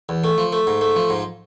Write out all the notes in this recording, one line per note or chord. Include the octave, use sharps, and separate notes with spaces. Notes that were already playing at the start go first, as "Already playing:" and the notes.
E2
A3
F3
A3
G#2
A3
F3
G#2